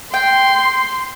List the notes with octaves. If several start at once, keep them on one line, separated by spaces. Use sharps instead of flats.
G5 C6